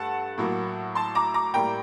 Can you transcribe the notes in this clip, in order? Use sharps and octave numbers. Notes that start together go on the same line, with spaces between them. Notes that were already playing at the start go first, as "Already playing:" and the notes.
Already playing: G2 A3 F#5 A5
A2 F#3 A#3
A5 C6
A#5 D6
A#5 D6
A2 G3 A#3 G5 A#5